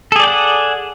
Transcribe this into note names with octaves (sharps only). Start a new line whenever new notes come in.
G#4 A4 D5 F#5 G5